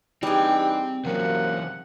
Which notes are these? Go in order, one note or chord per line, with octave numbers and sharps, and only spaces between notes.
E3 G3 C4 D4 D#4 G4 G#4 G5
F#2 C3 E3 F#3 A#3 F#5